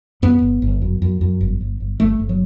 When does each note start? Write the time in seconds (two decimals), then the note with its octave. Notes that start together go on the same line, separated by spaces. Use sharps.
0.22 F#2 B3
0.42 G1
0.62 G1
0.82 F#2
1.02 F#2
1.21 F#2
1.41 G1
1.61 G1
1.80 G1
2.00 G1 A3
2.20 G1
2.29 F#3